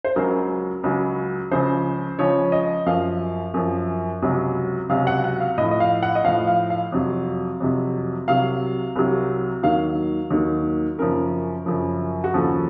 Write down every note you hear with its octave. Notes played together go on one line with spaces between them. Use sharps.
C5
C#2 C#3 F#3 A#4
C#2 C#3 F#3
C#2 C#3 F3 C5
C#2 C#3 F3 C#5
D#5
F#2 F3 F5
F#2 F3
C#2 C3 F#3
C#2 C3 F#3 F5
F#5
F#5
F5
A2 F3 D#5
D#5
F5
F#5
D#5
A2 F3 F5
F5
F5
F2 C3 F#3
F2 C3 F#3
C2 C3 F#3 F5
C2 C3 F#3
D#2 D#3 F#3 F5
D#2 D#3 F#3
F#2 C#3 F3 A#4
F#2 C#3 F3
F#4
D#2 C#3 F3 A4